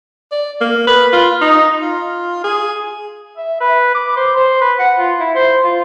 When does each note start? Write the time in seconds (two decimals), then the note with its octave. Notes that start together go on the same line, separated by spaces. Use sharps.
0.32 D5
0.61 A#3
0.87 B4
1.13 F4
1.41 D#4
1.82 F4
2.44 G#4
3.38 E5
3.61 B4
3.95 D6
4.17 C5
4.36 C5
4.61 B4
4.79 F#5
4.99 F4
5.20 E4
5.36 C5
5.64 F4